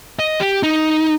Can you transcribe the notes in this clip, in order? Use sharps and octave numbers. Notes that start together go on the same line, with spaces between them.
D#5
G4
D#4